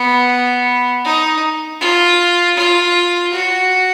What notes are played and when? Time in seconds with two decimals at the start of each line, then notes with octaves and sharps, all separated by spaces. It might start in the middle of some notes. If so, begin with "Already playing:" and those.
Already playing: B3
1.05 D#4
1.80 F4
2.57 F4
3.33 F#4